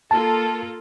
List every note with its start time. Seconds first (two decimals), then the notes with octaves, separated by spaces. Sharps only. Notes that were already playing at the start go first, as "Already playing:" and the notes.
0.11 A#3 F4 A4 A5